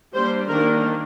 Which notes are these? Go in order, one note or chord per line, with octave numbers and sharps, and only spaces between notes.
G3 A#3 D4 C5
D#3 A#3 D4 A#4